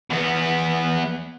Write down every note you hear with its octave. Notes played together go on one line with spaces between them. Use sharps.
E2 B3